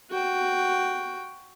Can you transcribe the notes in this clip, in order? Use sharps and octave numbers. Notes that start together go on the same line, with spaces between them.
F#4 G5